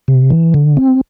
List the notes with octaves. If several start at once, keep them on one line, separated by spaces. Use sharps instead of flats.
C3
E3
D3
C4